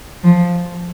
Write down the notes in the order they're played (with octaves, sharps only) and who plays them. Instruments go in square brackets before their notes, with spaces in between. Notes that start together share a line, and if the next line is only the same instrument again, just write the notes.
[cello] F3